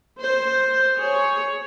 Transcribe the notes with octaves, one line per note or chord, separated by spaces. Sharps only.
C5
G#4 C#5